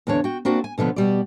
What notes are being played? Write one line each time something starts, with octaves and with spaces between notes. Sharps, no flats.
E2 D3 D4 C#5
F#4 G5
A#3 C4 D4 F#4
G#5
B2 D3 F3 B3
B2 G3 D5